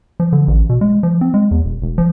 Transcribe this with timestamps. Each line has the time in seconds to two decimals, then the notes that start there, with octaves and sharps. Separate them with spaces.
0.20 F3
0.32 D3
0.48 A1
0.69 B2
0.81 G#3
1.03 F3
1.21 C4
1.34 G#3
1.51 E2
1.65 E1
1.82 E1
1.98 F3